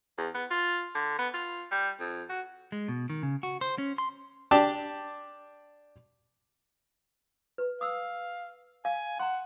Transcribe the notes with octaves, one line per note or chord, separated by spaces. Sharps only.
E2
B3
F4
D3
B3
F4
G3
F2
F#4
G#3
B2
D#3
C#3
F#4
C5
C#4
C6
D4 G4 A5
B4
F5 D#6 E6
F5 G#5
F#5 A#5 C6